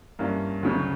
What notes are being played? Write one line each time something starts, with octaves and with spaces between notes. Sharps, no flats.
G2 E3 A#3 C#4
D2 C#3 F#3